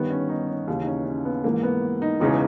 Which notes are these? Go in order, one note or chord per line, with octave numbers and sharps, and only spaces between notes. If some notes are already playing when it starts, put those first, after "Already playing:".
Already playing: G1 G2 D#3 B3
C#4
D#4
C#4
D#2 C#3 E3 C#4
D#4
C#4
C#4
B3
A#1 G#2 E3 A#3
B3
D#4
E1 E2 C#3 E3 D#4